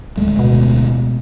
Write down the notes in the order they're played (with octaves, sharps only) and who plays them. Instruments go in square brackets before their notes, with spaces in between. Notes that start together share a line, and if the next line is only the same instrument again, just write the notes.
[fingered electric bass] D1 G#3 A3
[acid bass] B2